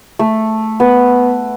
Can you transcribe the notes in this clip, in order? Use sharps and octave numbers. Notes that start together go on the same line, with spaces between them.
A3
B3